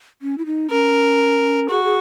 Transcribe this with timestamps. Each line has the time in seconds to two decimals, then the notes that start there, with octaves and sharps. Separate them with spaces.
0.22 C#4
0.38 E4
0.46 D#4
0.71 C#4 A#4
1.70 F#4 G#4
1.84 G#4